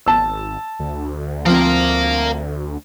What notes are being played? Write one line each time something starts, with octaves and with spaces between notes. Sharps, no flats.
G#1 A5 E6
D2
F3 C4 A#4 F5